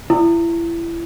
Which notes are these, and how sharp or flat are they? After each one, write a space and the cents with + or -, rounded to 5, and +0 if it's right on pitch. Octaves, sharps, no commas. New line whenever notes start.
E4 +30